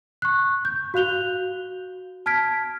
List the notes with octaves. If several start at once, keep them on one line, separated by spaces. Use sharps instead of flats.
C#6 F#6
G6
F#4 F5 F#6 F7 G7
A5 F6 G#6 B6 D7